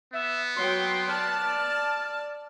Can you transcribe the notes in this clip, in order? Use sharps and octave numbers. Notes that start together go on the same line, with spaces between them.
B3 E5
F#3 G5 C6
D5 A5 F6